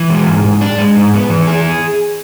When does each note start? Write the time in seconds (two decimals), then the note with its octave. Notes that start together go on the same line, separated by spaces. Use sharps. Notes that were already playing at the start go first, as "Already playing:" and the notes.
Already playing: E3
0.10 G#3
0.27 G#2
0.44 G#2
0.61 D4
0.78 G#3
0.96 G#2
1.14 B3
1.30 E3
1.47 G#4